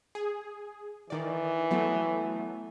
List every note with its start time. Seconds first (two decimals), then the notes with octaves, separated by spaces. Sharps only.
0.15 G#4
1.10 D#3 E3 D5
1.71 F#3 A3 B3